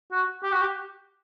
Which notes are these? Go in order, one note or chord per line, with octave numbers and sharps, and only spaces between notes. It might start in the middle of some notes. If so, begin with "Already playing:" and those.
F#4
G4
F#4
G4